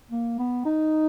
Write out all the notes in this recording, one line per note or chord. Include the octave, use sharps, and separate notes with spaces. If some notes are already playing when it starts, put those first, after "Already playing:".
A#3
B3
D#4